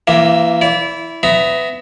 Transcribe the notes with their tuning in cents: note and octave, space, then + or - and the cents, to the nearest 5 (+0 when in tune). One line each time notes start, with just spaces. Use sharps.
E3 +25 A#3 -5 E5 +0
E4 +0 D5 -35
B3 +25 E5 +10 A#5 +5